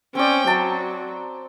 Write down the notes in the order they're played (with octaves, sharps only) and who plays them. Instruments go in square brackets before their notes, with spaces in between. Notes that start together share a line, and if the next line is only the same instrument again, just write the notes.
[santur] C4 D5 [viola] C#4 G5
[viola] F#3 [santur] A5 A#5